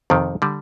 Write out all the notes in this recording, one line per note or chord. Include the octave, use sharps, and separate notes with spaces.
F2 C3 D#3
D3 G3